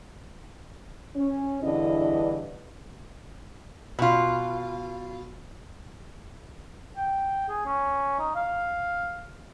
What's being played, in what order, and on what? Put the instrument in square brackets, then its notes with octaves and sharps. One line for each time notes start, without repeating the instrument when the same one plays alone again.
[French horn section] C#4
E2 G2 D3 E3 E4 D#5
[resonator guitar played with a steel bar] B2 F4
[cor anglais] G5
G#4
C#4
D#4
F5